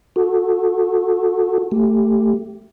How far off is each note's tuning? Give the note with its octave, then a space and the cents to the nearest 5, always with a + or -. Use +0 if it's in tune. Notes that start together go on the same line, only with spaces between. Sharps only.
F#4 -25 A4 +0
A3 +15 G4 +0